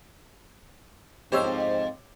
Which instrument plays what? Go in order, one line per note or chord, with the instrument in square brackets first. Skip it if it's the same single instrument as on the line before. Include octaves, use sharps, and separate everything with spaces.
[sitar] F2 C5 [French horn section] G#2 C4 D#5 [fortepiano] G4 C#5 E6